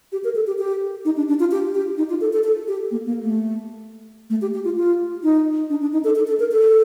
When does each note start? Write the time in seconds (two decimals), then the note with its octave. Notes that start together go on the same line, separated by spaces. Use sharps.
0.12 G4
0.24 A#4
0.35 A4
0.47 G4
0.59 G4
1.05 D#4
1.17 D4
1.28 D4
1.40 F4
1.51 G4
1.75 G4
1.98 D#4
2.10 F4
2.21 A4
2.33 A4
2.44 A4
2.68 G4
2.91 A#3
3.06 A#3
3.22 A3
4.30 A3
4.42 G4
4.54 G4
4.65 F4
4.77 F4
5.23 D#4
5.70 D4
5.81 D4
5.93 D#4
6.04 A4
6.15 A4
6.27 A4
6.40 A#4
6.51 A4